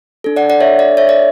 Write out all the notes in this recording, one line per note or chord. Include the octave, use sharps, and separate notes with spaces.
D4 A4
D5 F#5
D5 F#5
C#5 E5
D5
C#5 E5
D5